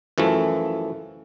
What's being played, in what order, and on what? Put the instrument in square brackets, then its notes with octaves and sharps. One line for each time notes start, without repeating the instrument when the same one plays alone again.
[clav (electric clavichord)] F#2 E3 F3 A3